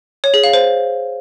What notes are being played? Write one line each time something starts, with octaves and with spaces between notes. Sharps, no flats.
C#5
G#4
F5
C5